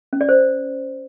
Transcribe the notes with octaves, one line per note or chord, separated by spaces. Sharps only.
C#4
D5
C5